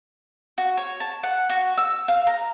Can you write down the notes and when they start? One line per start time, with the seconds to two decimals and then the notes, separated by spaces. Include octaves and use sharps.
0.58 F#4
0.77 C#5
1.00 A5
1.23 F#5
1.50 F#4
1.78 E6
2.08 F5
2.27 A#5